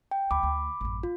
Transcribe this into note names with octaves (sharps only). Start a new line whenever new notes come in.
G5
D2 B5 D6
D2
A1 F#2
F4